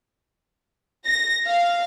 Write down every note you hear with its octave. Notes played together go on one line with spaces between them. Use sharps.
A#6
F5